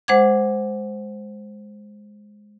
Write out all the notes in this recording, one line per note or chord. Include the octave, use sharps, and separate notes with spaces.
G#3 C5 F#5 D6 G#6